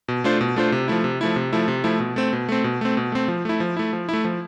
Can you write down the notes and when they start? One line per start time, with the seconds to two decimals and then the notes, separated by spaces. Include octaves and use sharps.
0.08 B2
0.24 A3 D4 F4 C5
0.41 B2
0.56 A3 D4 F4 C5
0.72 C3
0.88 F3 A3 E4
1.04 C3
1.21 F3 A3 E4
1.36 C3
1.53 F3 A3 E4
1.68 C3
1.84 F3 A3 E4
2.00 B2
2.16 A3 C4
2.33 B2
2.49 A3 C4
2.64 B2
2.81 A3 C4
2.97 B2
3.12 A3 C4
3.28 F3
3.45 A3 E4
3.60 F3
3.77 A3 E4
3.93 F3
4.09 A3 E4
4.25 F3